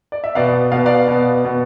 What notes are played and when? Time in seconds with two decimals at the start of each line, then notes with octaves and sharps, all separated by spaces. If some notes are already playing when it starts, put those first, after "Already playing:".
0.12 D5
0.24 E5
0.35 B2 B3 D5 F5
0.72 B2 B3 F5
0.86 D5 F5
1.08 B2 B3
1.44 B2 B3